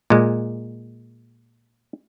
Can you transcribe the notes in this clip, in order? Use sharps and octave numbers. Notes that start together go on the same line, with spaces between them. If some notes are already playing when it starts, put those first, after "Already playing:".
A#2 G#3